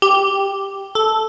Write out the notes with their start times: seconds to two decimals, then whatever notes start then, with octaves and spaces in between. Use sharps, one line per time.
0.02 G4
0.95 A4